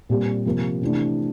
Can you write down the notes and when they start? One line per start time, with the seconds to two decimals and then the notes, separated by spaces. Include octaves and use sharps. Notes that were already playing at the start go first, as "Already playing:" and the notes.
0.09 A#2 G3 C4 G4
0.45 C3 F3 A#3
0.82 C3 E3 A3 D4